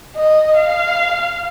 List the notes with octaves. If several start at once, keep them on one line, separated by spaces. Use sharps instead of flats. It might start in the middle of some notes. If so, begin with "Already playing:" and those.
D#5
F5